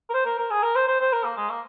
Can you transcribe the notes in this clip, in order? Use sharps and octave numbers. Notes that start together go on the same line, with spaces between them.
A#4
C5
A#4
A#4
G#4
A#4
C5
C5
C5
A#4
A#3
G#3
A#3